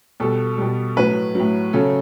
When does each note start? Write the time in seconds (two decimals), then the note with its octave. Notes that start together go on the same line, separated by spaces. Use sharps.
0.20 B2 G3 A4
0.58 B2 G3
0.96 A2 F#3 B4
1.35 A2 F#3
1.73 C#3 F#3 A4